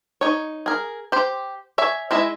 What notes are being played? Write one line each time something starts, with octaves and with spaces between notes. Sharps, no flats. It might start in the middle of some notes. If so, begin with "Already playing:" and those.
D#4 C#5
G#4 A#4
G4 C5
C#5 E5 G#5
G#3 E4 D#5 E5